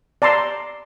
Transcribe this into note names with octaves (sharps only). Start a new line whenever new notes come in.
D5 A5 A#5 C6 E6